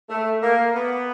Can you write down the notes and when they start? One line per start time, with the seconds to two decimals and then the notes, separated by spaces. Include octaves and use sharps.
0.09 A3
0.41 A#3
0.74 B3